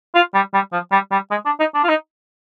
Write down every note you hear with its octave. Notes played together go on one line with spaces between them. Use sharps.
F4
G3
G3
F3
G3
G3
G#3
D4
D#4
D4
F4
D#4